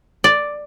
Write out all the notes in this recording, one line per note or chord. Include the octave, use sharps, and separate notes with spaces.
D5